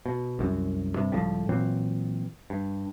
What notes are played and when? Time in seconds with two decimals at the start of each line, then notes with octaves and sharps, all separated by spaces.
0.06 B2
0.39 C2 F#2
0.96 G2 C3
1.12 C#2 A2 F3 G3
1.49 A#2 E3 F#3 C4
2.50 G2